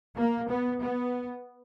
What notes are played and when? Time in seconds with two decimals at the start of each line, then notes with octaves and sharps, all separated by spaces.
0.17 A#3
0.49 B3
0.81 B3